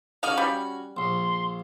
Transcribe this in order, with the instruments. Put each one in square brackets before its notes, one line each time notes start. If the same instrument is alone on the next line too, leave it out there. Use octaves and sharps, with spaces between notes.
[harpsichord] C#4 F#4 [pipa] D#5 F5
[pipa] G3
[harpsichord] A#1 [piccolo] C6